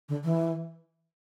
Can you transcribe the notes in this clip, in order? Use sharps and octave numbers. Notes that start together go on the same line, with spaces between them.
D3
E3